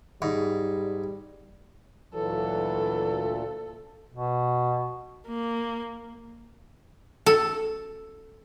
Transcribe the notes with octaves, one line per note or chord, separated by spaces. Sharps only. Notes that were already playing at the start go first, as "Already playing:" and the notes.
G#2 G3
D2 A#2 E3 F#3 A4
B2
A#3
A4